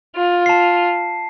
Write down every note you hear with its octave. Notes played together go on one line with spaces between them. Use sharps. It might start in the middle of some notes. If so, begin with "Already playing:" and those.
F4
A5 C7